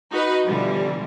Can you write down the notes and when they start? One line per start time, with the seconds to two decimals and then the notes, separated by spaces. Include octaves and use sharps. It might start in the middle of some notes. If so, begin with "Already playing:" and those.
0.12 D#4 F#4 B4 D#5
0.46 B2 D3 E3 F3 G3